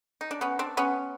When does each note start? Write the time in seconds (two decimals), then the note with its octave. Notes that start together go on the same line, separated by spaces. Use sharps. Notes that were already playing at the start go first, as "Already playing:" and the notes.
0.21 D#4
0.31 D4
0.41 B3 C#4
0.59 C4 D4
0.77 B3 C#4